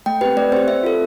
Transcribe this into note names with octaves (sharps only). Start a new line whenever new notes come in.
A3 G5
C4 G4 B4
A3 D5
C4 G4 C5
C4 E5
F4 A4